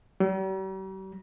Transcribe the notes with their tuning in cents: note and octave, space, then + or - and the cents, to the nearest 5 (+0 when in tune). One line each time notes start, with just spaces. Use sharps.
G3 -45